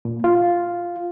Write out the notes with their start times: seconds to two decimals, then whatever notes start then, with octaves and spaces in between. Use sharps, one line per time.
0.05 A#2
0.24 F4